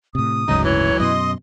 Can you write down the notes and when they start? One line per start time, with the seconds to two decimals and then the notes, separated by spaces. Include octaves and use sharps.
0.15 A2 C3 D#6
0.48 F#1 D2 G#2 C#3 F#3 D#4
0.64 E3 C#5
1.00 F#2 B2 D#5 C6 D#6